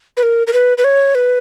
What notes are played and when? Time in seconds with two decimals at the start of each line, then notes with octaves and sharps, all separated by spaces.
0.17 B4
0.23 A#4
0.47 A#4
0.53 B4
0.78 B4
0.84 C#5
1.15 B4